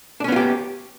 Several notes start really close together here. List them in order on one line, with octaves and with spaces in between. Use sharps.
D4 C#4 B3 F4 G4